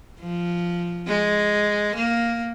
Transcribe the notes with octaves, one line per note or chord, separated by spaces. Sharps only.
F3
G#3
A#3